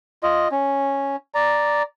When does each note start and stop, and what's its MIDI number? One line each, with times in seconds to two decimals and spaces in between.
0.23 0.48 65
0.23 0.48 75
0.52 1.16 61
1.34 1.82 74
1.34 1.82 82